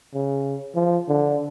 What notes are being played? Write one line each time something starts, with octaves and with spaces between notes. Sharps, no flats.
C#3
F3
D3